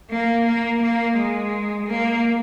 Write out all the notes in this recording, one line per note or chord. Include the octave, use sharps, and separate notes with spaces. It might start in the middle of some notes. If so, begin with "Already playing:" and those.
A#3
A#3
A#3
G#3
A#3